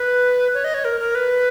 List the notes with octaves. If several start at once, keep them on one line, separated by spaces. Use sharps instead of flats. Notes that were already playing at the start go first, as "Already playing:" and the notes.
Already playing: B4
C#5
D#5
C#5
A#4
A#4
B4